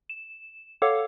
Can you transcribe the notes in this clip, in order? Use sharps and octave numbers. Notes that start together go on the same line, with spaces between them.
E7
A4 C#5 F5 F#5 D6